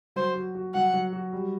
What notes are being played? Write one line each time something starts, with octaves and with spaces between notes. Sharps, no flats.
F#3 C5
F#4
F#4
F#3 F#5
F#3
F#4
G3